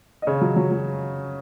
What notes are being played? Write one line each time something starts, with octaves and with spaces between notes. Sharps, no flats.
D#5
C#3 C#5
F#3
F#3
F#3